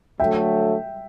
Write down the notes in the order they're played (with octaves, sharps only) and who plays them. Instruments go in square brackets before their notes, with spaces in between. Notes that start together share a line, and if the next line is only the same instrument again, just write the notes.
[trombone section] D3 F#3 A3 [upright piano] E5 G5